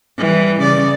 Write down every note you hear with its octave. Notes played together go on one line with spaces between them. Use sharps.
E3 G3
C#3 D5